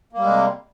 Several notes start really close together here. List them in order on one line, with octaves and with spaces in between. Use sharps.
A#3 G3 G#3 C3